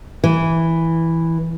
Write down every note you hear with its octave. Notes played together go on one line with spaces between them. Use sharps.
E3